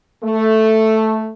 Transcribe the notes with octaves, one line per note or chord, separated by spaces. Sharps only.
A3